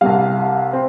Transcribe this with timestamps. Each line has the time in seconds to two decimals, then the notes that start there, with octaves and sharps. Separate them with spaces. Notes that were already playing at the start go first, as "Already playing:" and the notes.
0.01 C2 C3 G3 F5
0.73 C4